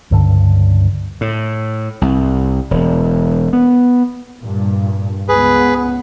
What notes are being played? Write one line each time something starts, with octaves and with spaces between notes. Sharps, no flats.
C#2 G2 D3
A2
C2
E1
B3
G2 A#2
C#2 B3 G#4 B4